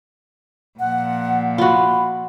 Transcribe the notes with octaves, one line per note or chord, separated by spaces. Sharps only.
A#2 F3 F#5
F4 F#4 B5